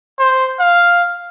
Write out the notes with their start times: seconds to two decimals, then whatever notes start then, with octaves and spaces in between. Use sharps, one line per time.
0.19 C5
0.59 F5